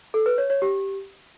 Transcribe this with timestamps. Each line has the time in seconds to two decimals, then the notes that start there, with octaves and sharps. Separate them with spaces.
0.14 A4
0.26 B4
0.38 C#5
0.50 C#5
0.62 G4